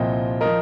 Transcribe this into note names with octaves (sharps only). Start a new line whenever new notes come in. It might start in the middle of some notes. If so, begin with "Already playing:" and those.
Already playing: C2 A#2 F3 D#5 G5
F3 A#4 D#5